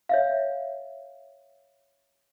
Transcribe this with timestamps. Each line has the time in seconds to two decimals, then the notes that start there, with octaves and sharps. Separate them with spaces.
0.09 C#5 E5 F5